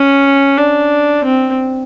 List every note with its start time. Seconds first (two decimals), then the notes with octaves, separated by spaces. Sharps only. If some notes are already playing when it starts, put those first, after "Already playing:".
Already playing: C#4
0.58 D4
1.24 C4